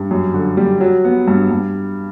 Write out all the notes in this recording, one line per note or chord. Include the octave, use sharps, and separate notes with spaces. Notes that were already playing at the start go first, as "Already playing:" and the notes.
Already playing: G2
F#2
D3
G3
F#3
B3
G2
G2